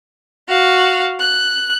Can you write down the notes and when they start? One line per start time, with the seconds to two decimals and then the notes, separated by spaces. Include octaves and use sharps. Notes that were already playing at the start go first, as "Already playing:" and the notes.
0.48 F#4 F5
1.20 F#6